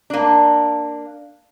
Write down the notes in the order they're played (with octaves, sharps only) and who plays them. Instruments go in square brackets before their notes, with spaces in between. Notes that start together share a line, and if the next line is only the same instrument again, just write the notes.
[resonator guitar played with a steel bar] A#3 D4